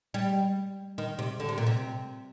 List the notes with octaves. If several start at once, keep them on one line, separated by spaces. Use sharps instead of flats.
G3
D#3
C3
D3
C3
A#2
C3